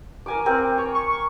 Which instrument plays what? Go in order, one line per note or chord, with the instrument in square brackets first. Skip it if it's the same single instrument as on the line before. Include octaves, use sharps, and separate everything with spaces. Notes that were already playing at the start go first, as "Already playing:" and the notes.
[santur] A#4 G#5 D6
C4 A#4
C#5
[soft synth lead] C#6